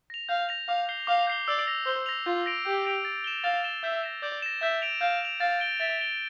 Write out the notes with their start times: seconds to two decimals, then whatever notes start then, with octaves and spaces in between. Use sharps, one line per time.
0.10 A#6 F7
0.29 F5 G6
0.49 A#6 F7
0.68 F5 D6
0.89 G6 C7 G7
1.07 F5 D6
1.27 G6 C7 G7
1.48 D5 E6
1.67 A#6 F7
1.86 C5 E6
2.06 A#6 F7
2.26 F4 G6
2.46 A#6 D7 F7
2.66 G4 G6
2.85 A#6 D7 F7
3.05 A6
3.24 E7 G7
3.44 F5 A6
3.64 E7 G7
3.83 E5 G6
4.03 A#6 E7
4.22 D5 G6
4.42 A#6 E7
4.62 E5 G6
4.82 D7 F7
5.01 F5 G6
5.21 D7 F7
5.40 F5 A6
5.60 D7 G7
5.80 E5 A6
6.00 D7 G7